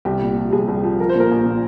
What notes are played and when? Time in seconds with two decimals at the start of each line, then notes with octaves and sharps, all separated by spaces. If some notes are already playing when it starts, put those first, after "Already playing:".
0.05 C2 G4
0.22 A#2
0.29 G4
0.37 F3
0.48 G4
0.52 C2 G#4
0.68 C2
0.77 G4
0.83 F3
1.00 F3 A#4
1.09 C5
1.15 A#2 A#4
1.31 A#1
1.46 A#2